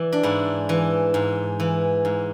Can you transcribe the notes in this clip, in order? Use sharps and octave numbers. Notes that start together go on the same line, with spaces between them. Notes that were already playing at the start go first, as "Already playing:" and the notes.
Already playing: E3 D5
D4
G#2 E4
E3
G#2
E3
G#2